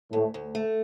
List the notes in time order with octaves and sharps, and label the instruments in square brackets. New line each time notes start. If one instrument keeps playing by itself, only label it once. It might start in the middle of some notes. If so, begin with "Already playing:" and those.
[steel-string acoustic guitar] D2 [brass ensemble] A2 A3
[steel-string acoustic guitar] D2
A3